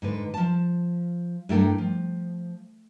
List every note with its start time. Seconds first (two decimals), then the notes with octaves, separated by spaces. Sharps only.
0.02 G#2 D3 B4
0.34 F3 A5
1.49 G2 A3 E4 A4 A#4 G5
1.78 F3